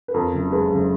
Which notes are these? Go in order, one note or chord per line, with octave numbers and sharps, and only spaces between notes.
B4
F2 A#4
F#1
G#3 B4
F#1